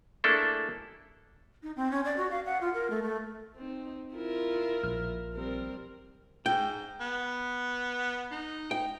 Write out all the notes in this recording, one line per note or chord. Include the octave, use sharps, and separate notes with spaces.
A3 A#3 D4 E4 G#4 A4
D#4
C4
C#4
D5
F#4
F5
F#5
F4
A#4
A3
A3
C4 D#4
E4 F4 A#4
A#1 F6
G3 C4 A#4
G#2 G5
B3
D#4
G5